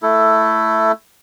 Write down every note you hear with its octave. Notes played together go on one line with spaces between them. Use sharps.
A3 E4 A4